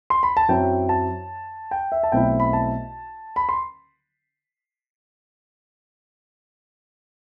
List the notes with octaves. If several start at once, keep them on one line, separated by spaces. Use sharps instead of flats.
C6
B5
A5
F#2 F#3 C4 E4 G5
A5
G5
E5
A5
B1 B2 A3 C4 E4 G5
B5
A5
B5
C6